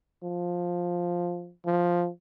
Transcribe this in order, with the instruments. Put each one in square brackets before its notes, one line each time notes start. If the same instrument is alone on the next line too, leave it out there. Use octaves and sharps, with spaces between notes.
[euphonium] F3
F3